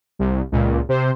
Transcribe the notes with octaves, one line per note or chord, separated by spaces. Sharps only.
C2
C#2 A#2
C3 C5